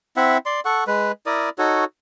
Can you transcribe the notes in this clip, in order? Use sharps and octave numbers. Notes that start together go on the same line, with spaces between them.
C4 E4 E5 F#5
D5 C6
A4 F#5 C#6
G#3 B4
E4 A#4 D5 D#6
D#4 F#4 A4 C#5